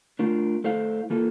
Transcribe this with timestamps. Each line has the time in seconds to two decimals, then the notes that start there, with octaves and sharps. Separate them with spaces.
0.19 A3 D4 F4 A#4
0.64 A3 E4 A4 C5 F5
1.10 E3 A#3 F4 A4